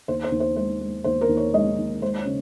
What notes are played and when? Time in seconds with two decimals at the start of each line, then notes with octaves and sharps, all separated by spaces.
0.08 D#2 C5
0.24 C5
0.32 D#2
0.40 C5
0.56 G#3 C5
0.81 G#3
1.04 D#2 C5
1.21 A#4
1.29 D#2
1.37 C#5
1.54 G#3 D#5
1.78 D#2
2.02 G#3 C5
2.19 C#5
2.26 C#3